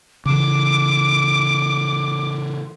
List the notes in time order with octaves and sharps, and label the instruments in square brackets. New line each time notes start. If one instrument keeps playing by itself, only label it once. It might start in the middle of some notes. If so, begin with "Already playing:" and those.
[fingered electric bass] C#3 E3 [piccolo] D6